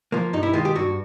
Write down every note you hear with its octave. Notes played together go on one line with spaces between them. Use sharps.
F3 A#3
G2 D#4
E4
D#3 G#3 F4
G4
G2 F#4